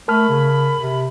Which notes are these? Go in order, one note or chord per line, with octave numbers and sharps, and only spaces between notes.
A3 A#4 A5 B5 F6
C#3
C3